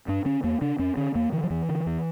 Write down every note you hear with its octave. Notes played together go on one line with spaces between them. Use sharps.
G2 D4
D3 C#4
E2 A#3
C#3 D4
F2 C#4
D3 C#4
E2 A#3
D3 E3
F3
E2 E3
D3
E2